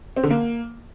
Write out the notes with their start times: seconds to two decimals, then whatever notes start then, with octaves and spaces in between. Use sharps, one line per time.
0.16 C4
0.23 D3
0.30 A#3